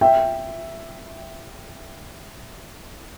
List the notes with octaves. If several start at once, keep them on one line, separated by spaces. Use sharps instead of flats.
E5 G5